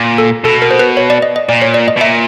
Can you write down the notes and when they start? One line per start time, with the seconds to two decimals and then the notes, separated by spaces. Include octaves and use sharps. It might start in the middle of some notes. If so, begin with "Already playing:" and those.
Already playing: A#2
0.18 A4
0.44 B2 A4
0.62 A#4
0.71 C5
0.79 B4
0.97 C#5
1.10 D5
1.22 D#5
1.36 D#5
1.49 A#2 D5
1.62 C#5
1.74 D5
1.88 D#5
1.97 B2
2.01 A#2 E5